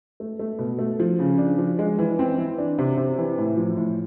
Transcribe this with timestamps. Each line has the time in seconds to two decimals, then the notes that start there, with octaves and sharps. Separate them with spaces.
0.20 A3
0.39 A3
0.59 B2
0.79 A3
1.00 F3
1.19 C#3
1.38 D4
1.58 F3
1.79 G#3
1.99 E3
2.19 C4
2.38 E3
2.58 D4
2.78 C3
2.98 C3
3.18 E3
3.38 A2
3.57 F3
3.77 A2